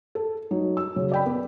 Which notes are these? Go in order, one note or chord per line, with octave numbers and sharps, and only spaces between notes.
A4
F#3 D#4
E6
C#3 F#3
D5 G5 B5
B3